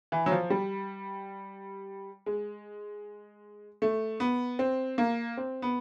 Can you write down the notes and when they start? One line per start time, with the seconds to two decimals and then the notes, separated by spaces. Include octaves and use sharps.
0.12 E3
0.26 F#3
0.32 F3
0.50 G3
2.26 G#3
3.82 A3
4.20 B3
4.59 C4
4.98 A#3
5.37 C4
5.62 B3